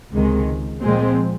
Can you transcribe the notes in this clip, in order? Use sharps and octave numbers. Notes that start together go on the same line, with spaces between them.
C#2 C3 D#3 G#3
A#2 F3 G#3 C4